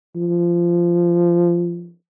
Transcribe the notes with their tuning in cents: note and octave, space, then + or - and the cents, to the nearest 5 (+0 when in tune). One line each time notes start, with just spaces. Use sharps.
F3 -15